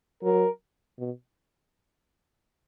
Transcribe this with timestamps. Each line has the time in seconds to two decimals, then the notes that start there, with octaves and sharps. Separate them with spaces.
0.23 F#3 A#4
0.99 B2